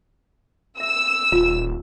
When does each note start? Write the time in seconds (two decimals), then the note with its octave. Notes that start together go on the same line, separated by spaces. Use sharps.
0.80 E5 E6
1.32 D#1 F4